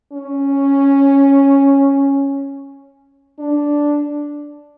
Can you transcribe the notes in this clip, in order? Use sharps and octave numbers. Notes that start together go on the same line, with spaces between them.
C#4
D4